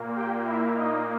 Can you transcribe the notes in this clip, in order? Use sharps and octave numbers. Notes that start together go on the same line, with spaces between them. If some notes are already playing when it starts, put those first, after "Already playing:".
Already playing: A#2 A#3
G4 G5
E4 E5
A#2 A#3 D#4 D#5